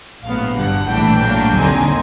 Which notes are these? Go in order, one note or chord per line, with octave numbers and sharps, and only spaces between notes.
A#1 A2 F#3 B3 F5
G1 G2 D3 G3 F#5
A#1 A2 E3 A3 D4 G5
A2 F#3 A#3 D4
D#2 D3 G3 C4 D#4 G#5